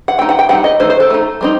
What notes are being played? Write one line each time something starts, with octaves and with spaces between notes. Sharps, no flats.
F#5
A3 D#4 G5
F#5
G5
G3 C4 D#4 F#5
D#5
D#3 A3 D#4 C5
C5
A4
A3 D#4
G3 C4 D#4